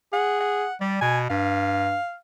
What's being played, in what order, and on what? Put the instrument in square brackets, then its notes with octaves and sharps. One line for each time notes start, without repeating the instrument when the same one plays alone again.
[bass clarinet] G#4 [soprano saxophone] F#5
[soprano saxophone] F#5
[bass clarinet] G3 [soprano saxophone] D5
[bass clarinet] B2 [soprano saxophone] G#5
[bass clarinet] G2 [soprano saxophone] F5